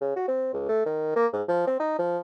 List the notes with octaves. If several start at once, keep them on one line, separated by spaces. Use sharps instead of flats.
C#3
F#4
C4
C#2
A3
D#3
A#3
G#2
F3
C4
D#4
F3